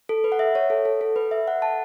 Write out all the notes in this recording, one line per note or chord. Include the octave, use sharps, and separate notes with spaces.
A4
B4
F#5
E5
C#5
A4
A4
A4
B4
E5
F#5
A5